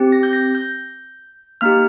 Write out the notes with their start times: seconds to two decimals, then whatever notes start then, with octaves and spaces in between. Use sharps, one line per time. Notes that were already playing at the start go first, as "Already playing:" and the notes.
Already playing: C4 G4
0.12 A#6
0.23 G6
0.33 A#6
0.55 G6
1.61 A#3 D#4 G4 F6